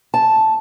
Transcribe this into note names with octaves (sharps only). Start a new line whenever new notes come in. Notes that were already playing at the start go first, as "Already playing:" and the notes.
A5